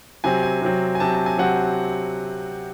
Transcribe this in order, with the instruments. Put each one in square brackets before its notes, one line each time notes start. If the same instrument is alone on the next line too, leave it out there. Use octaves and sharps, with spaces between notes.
[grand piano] C3 F#3 C4 G#5
G#5
C3 F#3 C4
G#5
C3 F#3 C4 A5
A5
G#5
C3 F#3 C4 F#5